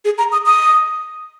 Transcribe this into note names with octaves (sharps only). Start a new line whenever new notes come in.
G#4
A#5
D#6
D#6